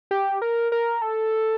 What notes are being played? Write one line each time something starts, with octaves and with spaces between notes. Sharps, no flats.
G4
A#4
A#4
A4